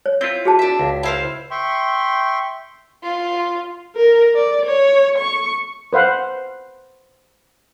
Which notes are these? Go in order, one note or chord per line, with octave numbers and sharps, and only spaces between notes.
C#5
C4 E4 F4 G6
F#4 G#4 A5
D4 E5
C#2
E4 C5 F5
E5 G5 C6 C#6
F4
A#4
D5
C#5
C#6
B4 C5 F5 F#5